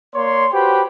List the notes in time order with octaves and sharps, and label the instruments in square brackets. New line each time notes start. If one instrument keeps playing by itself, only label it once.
[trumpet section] A#3 C#5 D5 C6
F#4 G4 B4 C5 G5 B5